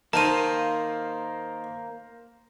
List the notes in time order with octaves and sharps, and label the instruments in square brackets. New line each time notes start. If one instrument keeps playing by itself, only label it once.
[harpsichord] D#3 [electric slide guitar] A#3 [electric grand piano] A#4 C5 C6 [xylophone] A5 D#7